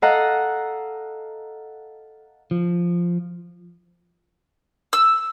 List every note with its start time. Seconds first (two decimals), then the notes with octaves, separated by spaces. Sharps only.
0.02 A4 D#5 F5 F#5 A#5
2.51 F3
4.93 E6